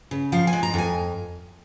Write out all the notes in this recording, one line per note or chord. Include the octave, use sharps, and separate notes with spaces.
C#3
F3 F5
G#5
G#3
A#5
F2 G#5